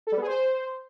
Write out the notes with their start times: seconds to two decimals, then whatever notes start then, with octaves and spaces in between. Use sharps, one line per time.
0.07 A4
0.12 G3
0.17 B3
0.22 G#4
0.27 C5